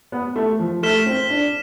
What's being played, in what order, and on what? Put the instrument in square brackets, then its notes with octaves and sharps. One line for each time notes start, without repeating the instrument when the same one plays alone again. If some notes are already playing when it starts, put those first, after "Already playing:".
[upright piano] B3
A3
F3
[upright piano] A3 [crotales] F6 B6 E7 G7
[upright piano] C4
D4